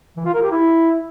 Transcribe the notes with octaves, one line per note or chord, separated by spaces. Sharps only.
E3
F4
A#4
G4
E4